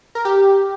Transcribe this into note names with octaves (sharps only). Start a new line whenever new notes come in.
A#4
G4